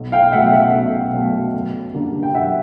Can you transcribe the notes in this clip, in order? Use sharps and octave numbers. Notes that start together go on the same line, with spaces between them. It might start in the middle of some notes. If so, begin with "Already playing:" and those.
Already playing: B1
F5 G5
B2 F#3 A3 E5 F#5
G5
E5 F#5
B1
B2 F#3 A3
F#2
D3 G3 A#3
G5
F#2 E5 F#5